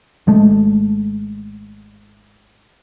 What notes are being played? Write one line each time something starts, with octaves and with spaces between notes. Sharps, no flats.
G#1 G#3 A3